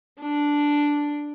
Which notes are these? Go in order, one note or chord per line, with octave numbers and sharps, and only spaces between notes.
D4